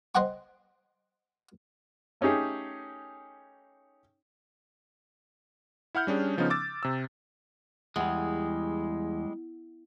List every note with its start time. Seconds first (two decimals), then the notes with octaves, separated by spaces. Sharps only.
0.15 C5 D#5 F#5 G5 C#6
2.21 A3 C#4 D#4 G4 G#4
5.95 E4 F#5 F6 G6
6.07 G3 C#4 D4 G#4
6.37 C#3 F3 B3 C#4 D#4
6.50 D6 E6 A6
6.83 C3 E6
7.96 E2 G3 G#3